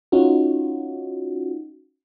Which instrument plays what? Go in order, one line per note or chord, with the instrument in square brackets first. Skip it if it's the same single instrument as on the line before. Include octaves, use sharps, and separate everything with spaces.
[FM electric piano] C#4 D#4 F4 F#4